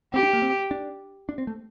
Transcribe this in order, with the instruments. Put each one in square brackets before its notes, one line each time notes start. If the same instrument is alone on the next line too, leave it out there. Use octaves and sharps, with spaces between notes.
[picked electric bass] C4 [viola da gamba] G4
[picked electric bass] D4
A#3
C4
D4
D4
C4
A3